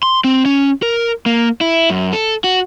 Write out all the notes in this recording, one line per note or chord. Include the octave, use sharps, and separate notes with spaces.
C6
C4
C#4
A#4
A#3
E4
F#2
A4
F#4